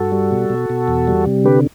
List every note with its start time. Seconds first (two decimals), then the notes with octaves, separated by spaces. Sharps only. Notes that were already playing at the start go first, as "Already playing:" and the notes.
Already playing: G2 F#4 A4
0.12 G3
0.31 B2
0.50 B2
0.70 B2
0.88 E2
1.08 G3
1.26 C3
1.44 D3 G4 B4